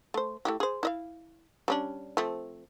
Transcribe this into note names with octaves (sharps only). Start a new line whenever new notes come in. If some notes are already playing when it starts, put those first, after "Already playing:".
A3 C5
A3 E4 G4
G#4 C5
E4 D#5 F5
G3 C#4 D4
F3 A3 C4